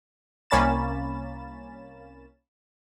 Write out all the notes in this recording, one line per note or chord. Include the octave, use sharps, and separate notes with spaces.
C2 A#3 C#4 B5 A6 E7